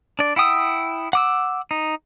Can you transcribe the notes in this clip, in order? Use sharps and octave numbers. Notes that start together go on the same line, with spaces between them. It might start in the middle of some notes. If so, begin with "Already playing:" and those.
D4 D5
E4 F#5 G5 D#6 E6
F#5 D6 E6
D#4